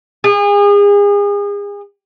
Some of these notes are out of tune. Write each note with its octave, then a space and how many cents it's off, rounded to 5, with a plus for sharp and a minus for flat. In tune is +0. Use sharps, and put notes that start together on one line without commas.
G#4 -35